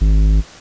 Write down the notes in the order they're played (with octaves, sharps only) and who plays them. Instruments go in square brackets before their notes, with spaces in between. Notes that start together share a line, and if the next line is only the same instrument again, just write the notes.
[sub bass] G#1